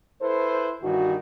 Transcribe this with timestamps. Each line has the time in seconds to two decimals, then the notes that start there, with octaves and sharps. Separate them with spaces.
0.22 E4 A4 B4 C5
0.82 G2 D#3 E3 F#4